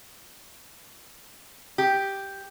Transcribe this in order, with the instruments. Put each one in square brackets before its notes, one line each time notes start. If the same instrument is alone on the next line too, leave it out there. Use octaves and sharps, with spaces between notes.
[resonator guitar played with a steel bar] G4